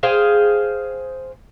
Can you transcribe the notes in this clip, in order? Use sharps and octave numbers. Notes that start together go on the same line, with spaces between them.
G#4 C5 F5 G5